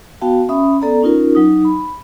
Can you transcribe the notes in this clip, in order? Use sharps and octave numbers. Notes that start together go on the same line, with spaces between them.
B3 F#4 F5 G5 A5
C#4 E5 B5 D#6
B3 A4 D5 A#5
C#4 D#4 F4 A#4
F#3 D#4 D#6
B5